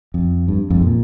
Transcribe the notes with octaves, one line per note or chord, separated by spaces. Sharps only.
F2
G2
F2 G#2
A#2